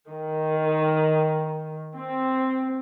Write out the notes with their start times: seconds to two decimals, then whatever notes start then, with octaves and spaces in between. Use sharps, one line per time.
0.10 D#3
1.97 C4